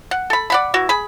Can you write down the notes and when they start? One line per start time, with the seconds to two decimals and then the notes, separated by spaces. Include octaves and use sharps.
0.11 F#5
0.30 A4 B5
0.50 D5 F#5 B5
0.74 E3 F#4
0.89 G#4 B5